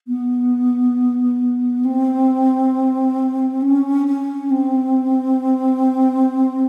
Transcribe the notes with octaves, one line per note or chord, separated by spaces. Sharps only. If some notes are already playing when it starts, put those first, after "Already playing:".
B3
C4
C#4
C#4
C4